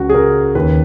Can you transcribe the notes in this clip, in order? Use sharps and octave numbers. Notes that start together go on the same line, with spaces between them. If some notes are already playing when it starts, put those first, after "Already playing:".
Already playing: C#2 F#4
G#4
C#3 A#4
D#2 B4